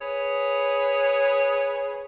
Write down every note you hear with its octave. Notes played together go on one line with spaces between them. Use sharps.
G#4 B4 C#5